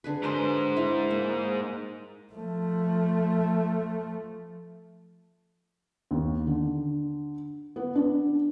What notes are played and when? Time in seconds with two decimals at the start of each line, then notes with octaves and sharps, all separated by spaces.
0.04 D3 G#4 B4
0.23 G#2 F#4 A#4 C5 C6
0.76 E4
1.10 A#3
2.33 F3 A3
6.11 D#2
6.47 D3
7.76 B3
7.95 D4